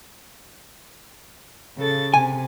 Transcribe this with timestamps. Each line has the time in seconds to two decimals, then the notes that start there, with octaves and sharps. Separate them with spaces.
1.77 C#3 A4 A6
2.14 C3 G#5